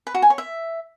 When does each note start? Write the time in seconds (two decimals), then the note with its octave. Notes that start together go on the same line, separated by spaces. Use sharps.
0.07 B4
0.14 F#4
0.22 G#5
0.30 C#5
0.38 E5